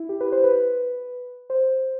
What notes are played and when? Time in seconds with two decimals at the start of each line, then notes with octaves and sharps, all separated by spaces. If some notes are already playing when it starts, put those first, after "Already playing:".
Already playing: E4
0.09 G4
0.21 B4
0.32 C5
0.44 B4
1.50 C5